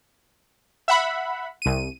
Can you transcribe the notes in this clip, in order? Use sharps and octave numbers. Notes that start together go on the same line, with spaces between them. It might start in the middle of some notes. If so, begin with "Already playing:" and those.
E5 F#5 B5
C2 D#7